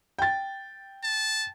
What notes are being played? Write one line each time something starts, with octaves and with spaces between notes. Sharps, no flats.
G5 A6
A5